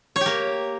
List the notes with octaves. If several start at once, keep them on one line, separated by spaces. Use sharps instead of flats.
C#5
G4
A#3